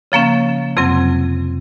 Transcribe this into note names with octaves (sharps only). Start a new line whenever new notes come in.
C#3 F3 A#3 C#4
F2 C3 F#3 C4